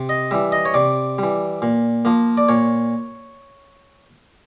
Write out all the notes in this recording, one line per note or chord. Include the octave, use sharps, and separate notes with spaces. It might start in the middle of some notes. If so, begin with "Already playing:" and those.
Already playing: C3
D#5
E3 G3 E5
D#5
C#5
C3 D5
E3 G3
A#2
F3 A#3
D5
A#2 C#5